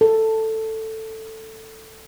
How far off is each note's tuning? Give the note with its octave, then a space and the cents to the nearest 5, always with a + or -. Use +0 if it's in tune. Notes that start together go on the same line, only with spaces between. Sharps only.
A4 +10